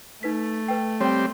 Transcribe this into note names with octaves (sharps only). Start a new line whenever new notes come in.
A3 D#4 B4 B6
B4 G5
G3 C4 C#5 G5